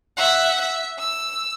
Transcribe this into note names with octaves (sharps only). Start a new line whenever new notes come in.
E5 F#5
E5
E6